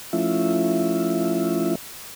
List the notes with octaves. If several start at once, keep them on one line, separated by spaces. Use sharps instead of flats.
F3 A3 C#4 E4 F4 E5